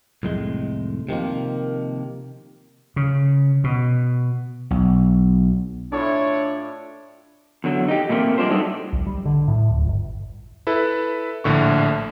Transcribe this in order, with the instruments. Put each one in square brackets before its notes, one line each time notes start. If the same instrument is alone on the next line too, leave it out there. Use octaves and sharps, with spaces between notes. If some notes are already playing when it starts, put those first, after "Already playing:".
[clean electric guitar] C2 F2 A2 G#3
C3 D#3 F3 A#3
[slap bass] C#3
B2
B1
[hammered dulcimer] A2 F4 B5 [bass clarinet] D4 [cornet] C#5
[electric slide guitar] E2 D3 F#3
D#4 G4
A#2 G3 A3 A#3 C4 G4
G3 G#3 D4 F4 C5
F#3 G3 A3 D4 D#4 A4
[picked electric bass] A#1
G3
D3
A2
D1
G1
[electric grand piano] E4 A4 B4
A#1 A2 D3 C#6